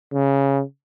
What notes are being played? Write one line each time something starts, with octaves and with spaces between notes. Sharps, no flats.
C#3